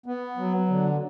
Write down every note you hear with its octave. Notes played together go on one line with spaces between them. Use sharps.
B3
F#3
D3